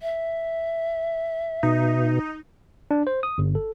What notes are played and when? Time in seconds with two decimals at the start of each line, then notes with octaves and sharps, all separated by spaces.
0.02 E5
1.63 B2 D#4
2.91 D4
3.07 C5
3.23 D#6
3.38 G1
3.55 A4